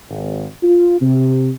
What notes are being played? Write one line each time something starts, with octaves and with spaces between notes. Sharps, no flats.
G#1
F4
C3